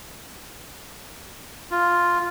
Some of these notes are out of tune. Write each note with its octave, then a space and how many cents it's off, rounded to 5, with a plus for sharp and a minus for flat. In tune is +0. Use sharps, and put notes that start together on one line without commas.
F4 +0